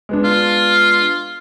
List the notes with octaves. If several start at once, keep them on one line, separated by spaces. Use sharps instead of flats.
G#3 B3 D4
F4